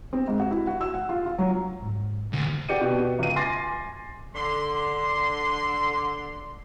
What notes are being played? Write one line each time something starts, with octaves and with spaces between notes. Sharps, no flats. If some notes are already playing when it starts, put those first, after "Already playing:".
C4
G#2
F#4
E4
F#4
E6
F#5
F4
F4
F#3
G#2
E1 D2 A#2 G#3
F#4 G4 D5 G6 C#7 D#7
B2 G4
C#2 D#7
G#5 C6 D6 A6 A#6 C7
D3 C6